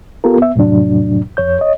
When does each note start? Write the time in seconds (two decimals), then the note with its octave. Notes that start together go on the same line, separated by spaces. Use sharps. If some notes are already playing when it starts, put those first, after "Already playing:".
0.24 B3 F4 G4 A4 A#4
0.38 B3 E5
0.56 F2 A2 C3 F#3 D4
1.37 F2 C#5 G6
1.59 C#5 D#5